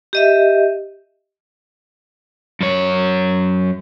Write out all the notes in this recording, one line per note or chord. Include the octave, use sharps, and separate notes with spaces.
G4 D#5 E5
F#2 C#5